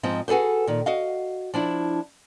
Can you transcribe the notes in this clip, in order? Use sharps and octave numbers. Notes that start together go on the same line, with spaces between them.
G#2 F3 C4 D#5
F#4 G#4 A4 B4 C5
A#2 D#3
F#4 D#5 F5
F3 D4 E4